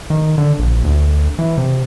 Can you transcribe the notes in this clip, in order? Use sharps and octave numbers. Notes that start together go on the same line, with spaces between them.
D#3
D3
A#1
D2
E3
C3